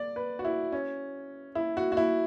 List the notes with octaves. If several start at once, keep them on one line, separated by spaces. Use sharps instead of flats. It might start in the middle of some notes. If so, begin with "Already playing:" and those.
Already playing: D5
B4
F#4
E4
C#4
E4
F#4
F#4
E4